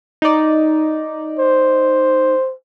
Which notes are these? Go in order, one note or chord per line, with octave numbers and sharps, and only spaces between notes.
D#4 D5
C5